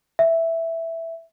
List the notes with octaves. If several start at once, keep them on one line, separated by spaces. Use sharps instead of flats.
E5